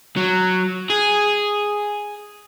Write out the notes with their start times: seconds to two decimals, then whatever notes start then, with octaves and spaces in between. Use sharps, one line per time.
0.16 F#3
0.90 G#4